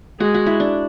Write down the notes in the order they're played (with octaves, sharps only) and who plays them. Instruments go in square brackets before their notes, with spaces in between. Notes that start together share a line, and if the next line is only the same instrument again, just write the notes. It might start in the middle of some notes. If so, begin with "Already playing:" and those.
[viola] G#3 [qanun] F#4
[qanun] F#4
E4
D4